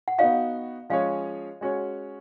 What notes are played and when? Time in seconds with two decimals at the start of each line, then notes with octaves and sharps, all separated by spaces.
0.08 F#5
0.18 B3 D#4 F#4 F5
0.90 F3 G#3 C#4 G#4 C#5 F5
1.61 G#3 C#4 F#4 C#5